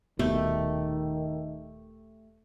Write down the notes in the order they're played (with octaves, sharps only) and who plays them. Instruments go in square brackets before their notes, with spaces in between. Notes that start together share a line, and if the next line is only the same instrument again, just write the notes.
[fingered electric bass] D#1 B2 [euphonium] D#3 [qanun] A3 G4